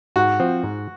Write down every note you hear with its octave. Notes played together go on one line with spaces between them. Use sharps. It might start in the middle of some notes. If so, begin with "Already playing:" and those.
G#2 F#4
F3 C4
G#2